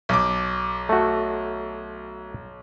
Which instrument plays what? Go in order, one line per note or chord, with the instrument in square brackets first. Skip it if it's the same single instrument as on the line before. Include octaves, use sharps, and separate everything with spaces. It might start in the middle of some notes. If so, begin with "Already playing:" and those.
[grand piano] B1 D6
[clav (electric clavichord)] A3 F#4